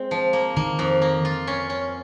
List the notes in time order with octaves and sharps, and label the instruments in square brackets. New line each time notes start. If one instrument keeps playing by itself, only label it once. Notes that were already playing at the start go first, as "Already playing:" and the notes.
Already playing: [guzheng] G#3 C4
F3
A#3
[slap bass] D#3 [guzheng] A#3
[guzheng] F2
A#3
F4
C#4
C#4